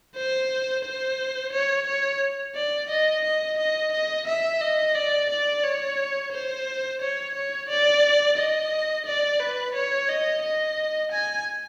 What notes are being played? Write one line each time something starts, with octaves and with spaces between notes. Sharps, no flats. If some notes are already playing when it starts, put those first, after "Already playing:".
C5
C5
C#5
C#5
D5
D#5
D#5
D#5
D#5
E5
D#5
D5
D5
C#5
C5
C#5
C#5
D5
D#5
D5
B4
C#5
D#5
D#5
G#5